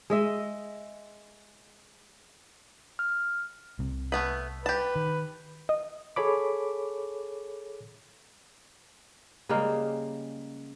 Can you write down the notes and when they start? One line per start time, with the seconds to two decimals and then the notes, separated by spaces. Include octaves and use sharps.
0.10 G#3 D#5 E5
2.99 F6
3.79 C2 C3
4.12 A3 B3 B4
4.66 G4 B4 A5
4.96 D#3
5.69 D#5
6.16 G#4 A4 C#5 B5 D6
9.49 C#3 G3 G#3 A#3